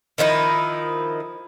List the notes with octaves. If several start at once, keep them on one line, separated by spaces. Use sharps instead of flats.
D#3 F3 D#4 E4